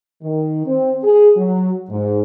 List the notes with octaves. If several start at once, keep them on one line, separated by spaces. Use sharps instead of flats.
D#3
C4
G#4
F#3
G#2